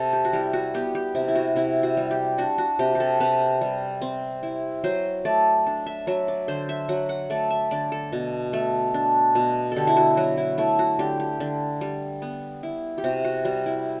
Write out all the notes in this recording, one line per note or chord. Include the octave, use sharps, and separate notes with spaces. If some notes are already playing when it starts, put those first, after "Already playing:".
Already playing: C3 A4
G4
F#4
G3 E4
F#4
B3 G4
G4
C3 E4
E4
F#4
C3 E4
F#4
G3
G4
D4 F#4
F#4
C3 G4
G4
A4
C3 B4
G3
C4
E4
F#3 C5
A3 D5
D4
E5
F#3 E5
D5
D3 C5
E5
F#3 F#5
F#5
A3 D5
E5
D3 D5
A4
B2
A3
D4
B2
D3 G4 A4
E4
F#4
F#3 F#4
E4
A3 E4
F#4
D3 G4
G4
D3
G3
B3
E4
G4
C3 F#4
F#4
G3 F#4
E4